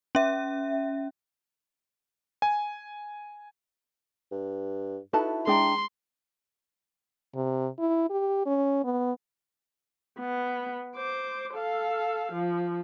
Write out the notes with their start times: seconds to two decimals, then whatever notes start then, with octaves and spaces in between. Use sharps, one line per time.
0.15 C#4 E5
2.42 G#5
4.32 G2
5.13 D#4 E4 F#4 A4 B4 A5
5.47 G#3 D4 G#4 G5 A#5 C6
7.35 C3
7.79 E4
8.10 G4
8.46 C#4
8.84 B3
10.19 B3
10.96 C5 D6
11.54 A4 F5
12.32 F3